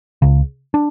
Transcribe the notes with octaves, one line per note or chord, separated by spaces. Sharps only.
C#2 C#3
D4